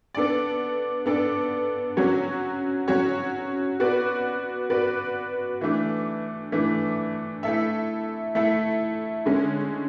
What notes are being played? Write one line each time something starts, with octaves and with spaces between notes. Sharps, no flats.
B3 D4 A4 D5
B3 D4 A4 D5
F#3 C#4 F#4 C#5
F#3 C#4 F#4 C#5
B3 F#4 B4 D5
B3 F#4 B4 D5
E3 A3 D4
E3 A3 D4
A3 E4 A4 E5
A3 E4 A4 E5
D3 G#3 C#4